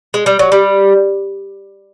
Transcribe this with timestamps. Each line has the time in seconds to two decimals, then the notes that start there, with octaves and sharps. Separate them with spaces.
0.14 G#3
0.26 G3
0.39 F#3
0.52 G3